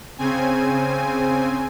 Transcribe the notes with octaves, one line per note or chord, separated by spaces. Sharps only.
C#3 C4 G#5